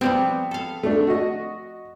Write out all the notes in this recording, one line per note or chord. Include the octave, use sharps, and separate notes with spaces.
F3 G3 B3 C4
A4 F5
A3 D4
F#4 D#5